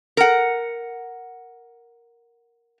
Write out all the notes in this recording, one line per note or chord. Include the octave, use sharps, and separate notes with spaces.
A#4 F#5